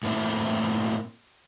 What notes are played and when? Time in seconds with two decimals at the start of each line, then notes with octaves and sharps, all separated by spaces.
0.03 A2 A3 A#3 C4 E4